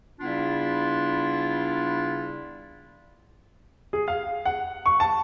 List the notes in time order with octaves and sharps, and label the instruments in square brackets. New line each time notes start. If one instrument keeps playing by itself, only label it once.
[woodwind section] C#3 G3 B3 D4 E4 F4
[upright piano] G#4
F5
F#5
C#6
A5